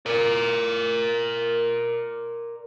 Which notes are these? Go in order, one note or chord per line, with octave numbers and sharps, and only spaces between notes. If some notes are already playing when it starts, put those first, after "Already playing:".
A#4 D5